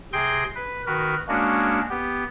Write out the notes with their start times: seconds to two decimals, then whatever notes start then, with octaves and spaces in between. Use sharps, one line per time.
0.13 C3 G#4 G5 C6 A#6
0.55 B4
0.87 D#3 F#4 A#4 B4
1.28 G#3 A#3 C#4 D4 F#4
1.89 B3 G4